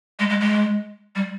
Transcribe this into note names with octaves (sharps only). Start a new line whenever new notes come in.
G#3
G#3
G#3
G3